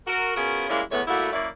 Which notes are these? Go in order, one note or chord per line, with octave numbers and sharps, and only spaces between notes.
F#4 A#4
B3 C#4 F4 F#4 G#4 A#4
G3 G#3 A#3 C#4 E4
E2 A2 E3 A3 B3 C#5
G3 A3 A#3 E4 F#4
F#2 A#3 E4 C#5 D5